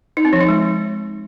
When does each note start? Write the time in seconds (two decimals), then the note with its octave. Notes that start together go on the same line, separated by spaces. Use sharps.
0.17 D#4
0.25 C4
0.33 F3
0.41 D#4
0.49 G#3